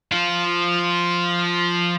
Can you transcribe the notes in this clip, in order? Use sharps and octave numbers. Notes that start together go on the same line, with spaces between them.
F3 F4